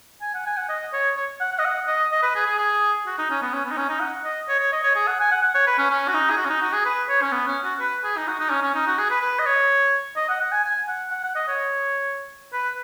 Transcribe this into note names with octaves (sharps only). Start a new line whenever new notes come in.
G#5
F#5
G#5
F#5
D#5
C#5
C#5
F#5
F#5
D#5
F#5
D#5
D#5
B4
G#4
G#4
G#4
F#4
D#4
C#4
B3
C#4
B3
D#4
C#4
D#4
F#5
D#5
C#5
C#5
D#5
C#5
G#4
F#5
G#5
F#5
F#5
C#5
B4
C#4
C#4
F#4
D#4
G#4
F#4
C#4
D#4
F#4
G#4
B4
C#5
C#4
B3
C#4
F#4
B4
G#4
D#4
F#4
D#4
C#4
C#4
D#4
F#4
G#4
B4
B4
D#5
C#5
D#5
F#5
F#5
G#5
G#5
F#5
F#5
F#5
D#5
C#5
B4